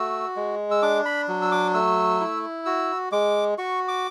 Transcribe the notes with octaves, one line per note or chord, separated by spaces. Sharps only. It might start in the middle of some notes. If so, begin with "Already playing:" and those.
Already playing: A3 F#4 E6
G#3
E6
D4 D6
B5
F#3
E6
D6
A3 E6
E4
F#4 E6
G#3 D6
F#4 C#6
D6